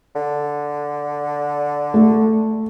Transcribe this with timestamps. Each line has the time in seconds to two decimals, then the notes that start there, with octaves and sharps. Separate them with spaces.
0.15 D3
1.94 A3